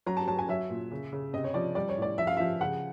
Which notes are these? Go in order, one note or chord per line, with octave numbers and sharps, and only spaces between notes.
F#3 A#5
A5
F#3 A5
G#5
F#3 E5
A#2
C#3
C#3
C3 D#5
C#5
F3 D5
G3 D5
C#5
A2 D5
F3 E5
F5
F3 E5
C#3 F#5